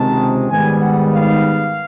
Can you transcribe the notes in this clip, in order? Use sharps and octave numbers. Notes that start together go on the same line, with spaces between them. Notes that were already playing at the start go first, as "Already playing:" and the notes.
Already playing: C#2 C3 D#3 G#3 C4 A5
G#2 D#3 G3 B3 G#5
F#5
F5